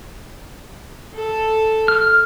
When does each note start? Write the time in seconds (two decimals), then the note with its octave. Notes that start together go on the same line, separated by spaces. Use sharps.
1.15 A4
1.88 F6